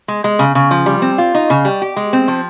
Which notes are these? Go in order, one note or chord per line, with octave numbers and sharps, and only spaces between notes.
G#3
G#3
C#3
C#3
F3
G3
C4
F4
D#4
C#3
G3
G4
G#3
C4
F3